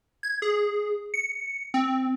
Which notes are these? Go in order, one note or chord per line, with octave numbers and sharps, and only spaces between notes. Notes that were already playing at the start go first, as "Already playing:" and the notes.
G#6
G#4
C#7
C4